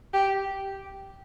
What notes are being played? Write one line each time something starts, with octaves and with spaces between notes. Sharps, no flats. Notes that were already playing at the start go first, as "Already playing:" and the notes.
G4